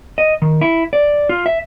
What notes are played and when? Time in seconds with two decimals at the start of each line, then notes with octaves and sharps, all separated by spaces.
0.18 D#5
0.42 D#3
0.61 E4
0.93 D5
1.29 F4
1.46 E5